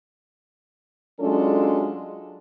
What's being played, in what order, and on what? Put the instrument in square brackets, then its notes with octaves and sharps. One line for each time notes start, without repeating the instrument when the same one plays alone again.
[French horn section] F#3 G#3 C#4 D4 F4 A4